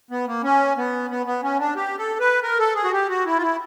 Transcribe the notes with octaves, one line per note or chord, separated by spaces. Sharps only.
B3
A#3
C#4
B3
B3
B3
C#4
D4
G4
A4
B4
A#4
A4
G#4
F#4
G4
F#4
E4
F4
E4